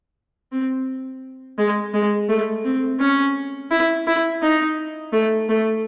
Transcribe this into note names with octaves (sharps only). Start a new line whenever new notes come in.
C4
G#3
G#3
A3
C4
C#4
E4
E4
D#4
A3
A3